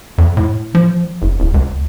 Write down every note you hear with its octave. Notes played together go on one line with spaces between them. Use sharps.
F2
A2
F3
F#1
D1
C#2